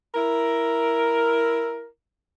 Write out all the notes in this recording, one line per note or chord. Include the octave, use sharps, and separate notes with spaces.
E4 A#4